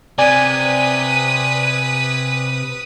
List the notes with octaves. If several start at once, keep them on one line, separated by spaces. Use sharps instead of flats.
C3 B4 D5 G#5 D#6